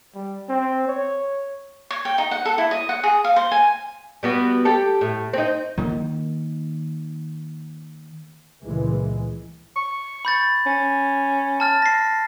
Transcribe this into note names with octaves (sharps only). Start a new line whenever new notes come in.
G3
C4
C#5
C#5
G5
D#4
F#5
A4
E4
D#5
F#5
G#4
F5
C5
G#5
G3 B3 F#4
G4 A4
A2
C4 D#4
D#3 A#3
C#2 A#2 E3 G#3
C#6
B5 G6 A6
C#4
A5 F6 A6
A#6 C7